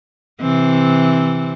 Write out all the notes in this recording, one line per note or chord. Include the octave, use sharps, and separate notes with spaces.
C3 E3 C4